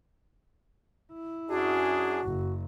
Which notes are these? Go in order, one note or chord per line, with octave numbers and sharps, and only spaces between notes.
E4
F#2 D4 F#4 G#4
F#1